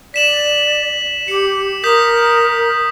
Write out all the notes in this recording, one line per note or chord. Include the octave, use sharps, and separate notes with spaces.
D5 B6 E7 F#7
G4 C#7
A#4 D#6 G6 B6